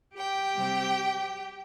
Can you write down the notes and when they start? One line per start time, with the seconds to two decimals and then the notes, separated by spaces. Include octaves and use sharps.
0.16 G4 G5
0.56 C3 G3 C4